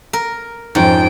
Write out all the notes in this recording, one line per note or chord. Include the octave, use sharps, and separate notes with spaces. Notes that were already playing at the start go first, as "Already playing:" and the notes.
A#4
F2 G#2 C#4 D#4 G5